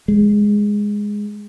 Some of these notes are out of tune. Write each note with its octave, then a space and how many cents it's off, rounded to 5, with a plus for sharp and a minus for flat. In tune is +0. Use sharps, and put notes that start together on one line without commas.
G#3 -5